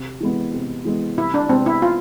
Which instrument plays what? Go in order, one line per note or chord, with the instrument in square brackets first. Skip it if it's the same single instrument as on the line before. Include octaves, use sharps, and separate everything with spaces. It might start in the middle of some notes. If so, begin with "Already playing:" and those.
Already playing: [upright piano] C3
E3 G#3 B3
C3
E3 G#3 B3
[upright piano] C2 [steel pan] E4
[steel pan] D4
[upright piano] C3 G#3 B3 [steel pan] C4
[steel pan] E4
F4